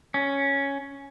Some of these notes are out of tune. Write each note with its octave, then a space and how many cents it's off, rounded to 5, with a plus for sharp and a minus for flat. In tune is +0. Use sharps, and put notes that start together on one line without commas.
C#4 +0